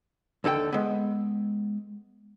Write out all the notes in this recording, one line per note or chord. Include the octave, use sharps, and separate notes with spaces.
D#2 D3 A4 G5
G#3 B3